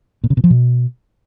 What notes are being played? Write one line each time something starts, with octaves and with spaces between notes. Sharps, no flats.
A#2
C#3
B2
F3
B2